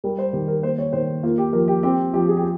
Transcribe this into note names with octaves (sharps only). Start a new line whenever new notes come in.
G3 A#4
C5
D#3 G4
A#4
A#3 C5
C#5
D#3 C5
A#3 F4
G4
F3 A#4
G4
C4 G4
F3 G4
G#4
G4